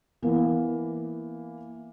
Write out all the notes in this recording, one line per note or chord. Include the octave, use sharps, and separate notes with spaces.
E3 A#3 B3